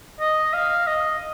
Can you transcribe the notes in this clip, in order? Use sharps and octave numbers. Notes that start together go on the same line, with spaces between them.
D#5
F5
D#5